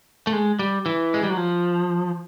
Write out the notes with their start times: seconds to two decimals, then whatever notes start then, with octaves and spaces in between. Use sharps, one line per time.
0.27 A3
0.33 G#3
0.59 G3
0.86 E3
1.14 G#3
1.23 G3
1.30 F#3
1.37 F3